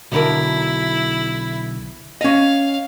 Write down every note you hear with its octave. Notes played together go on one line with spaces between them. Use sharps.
B1 D3 E4 A#4
C#4 D#5 F5